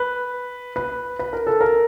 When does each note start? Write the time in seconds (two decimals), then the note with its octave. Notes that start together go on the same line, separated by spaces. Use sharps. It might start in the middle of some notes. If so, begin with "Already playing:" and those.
Already playing: B4
0.76 B4
1.19 B4
1.33 A#4
1.47 A4
1.61 A#4